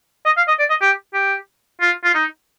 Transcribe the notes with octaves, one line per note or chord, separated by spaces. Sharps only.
D#5
F5
D#5
D5
D#5
G4
G4
F4
F4
D#4